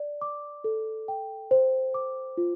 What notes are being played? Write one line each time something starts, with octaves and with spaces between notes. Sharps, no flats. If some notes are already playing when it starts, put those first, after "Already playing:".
Already playing: D5
D6
A4
G5
C5
D6
F4